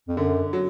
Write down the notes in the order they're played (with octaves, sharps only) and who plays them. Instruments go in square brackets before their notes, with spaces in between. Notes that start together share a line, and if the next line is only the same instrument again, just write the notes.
[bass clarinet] F2
[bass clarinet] F#2 [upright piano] D3
[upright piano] F#3